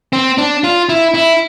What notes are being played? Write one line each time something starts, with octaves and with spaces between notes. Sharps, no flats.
C4
D4
F4
E4
E4